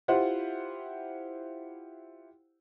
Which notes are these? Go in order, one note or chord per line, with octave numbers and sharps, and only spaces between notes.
E4 F4 G4 C5 F#5